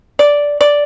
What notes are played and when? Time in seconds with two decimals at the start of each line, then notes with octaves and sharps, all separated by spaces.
0.19 D5
0.61 D5